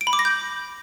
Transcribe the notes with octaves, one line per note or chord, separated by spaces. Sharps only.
D7
B5
D6
A#6
G6